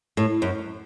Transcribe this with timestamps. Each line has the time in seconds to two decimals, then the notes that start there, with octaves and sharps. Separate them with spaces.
0.17 A2
0.42 F#2